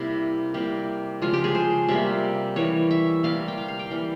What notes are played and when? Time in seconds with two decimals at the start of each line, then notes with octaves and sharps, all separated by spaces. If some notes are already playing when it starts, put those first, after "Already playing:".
Already playing: C3 G3 A#3 E4
0.54 C3 G3 A#3 G4
1.22 C#3 F3 G#3 F4
1.33 G4
1.44 G#4
1.55 C5
1.88 C3 G3 A#3 E5
2.56 E3 G3 A#3 C#5
2.91 E5
3.23 C3 G3 A#3 F5
3.48 G5
3.58 F5
3.68 F5
3.79 G5
3.91 E3 G3 A#3